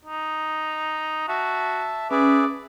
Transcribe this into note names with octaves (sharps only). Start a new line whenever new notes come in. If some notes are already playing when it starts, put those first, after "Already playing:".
D#4
F#4 E5 A5
C#4 G#4 B4 D5 E5